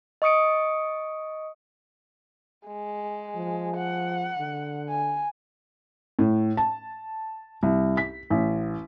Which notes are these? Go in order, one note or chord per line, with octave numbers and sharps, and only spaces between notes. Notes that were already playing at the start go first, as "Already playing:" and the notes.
D#5 C#6 D#6 C#7 D7
G#3
F3
F#5
D3
G#5
A2
A5
C2
B6
A1